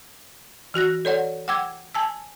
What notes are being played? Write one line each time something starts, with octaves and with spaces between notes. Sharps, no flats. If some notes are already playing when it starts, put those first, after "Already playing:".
E3 F#4 F#6 A#6
A4 C#5 D5 F#5
F#5 G5 D6 E6 G#6
G#5 A5 E6